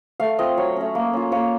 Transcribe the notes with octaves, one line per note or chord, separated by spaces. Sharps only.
A3 F5
C4 F4 D#5
F#3 C#5
A3 C#4
A#3
C#4 F4
A#3 C#5